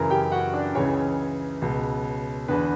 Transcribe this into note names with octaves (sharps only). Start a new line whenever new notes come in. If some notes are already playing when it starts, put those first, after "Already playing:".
Already playing: F#2 C#3 E3 A#4 A#5
G4 G5
F#4 F#5
D4 D5
C#2 C#3 E3 C#4 C#5
C#2 B2
E2 D3 B3 B4